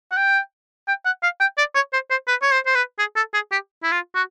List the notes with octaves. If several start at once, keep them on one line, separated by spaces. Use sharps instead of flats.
F#5
G5
G5
F#5
F5
G5
D5
C#5
C5
C5
B4
C#5
C5
C5
B4
G#4
A4
G#4
G4
E4
F4
F#4